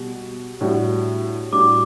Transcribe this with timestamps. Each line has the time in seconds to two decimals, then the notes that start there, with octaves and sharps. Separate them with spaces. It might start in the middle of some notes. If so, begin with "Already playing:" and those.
Already playing: B2 G3
0.61 A2 G3 D4 F#4
1.52 A2 G3 D4 F#4 D6